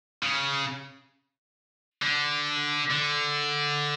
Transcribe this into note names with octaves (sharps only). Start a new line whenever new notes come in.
C#3
D3
D3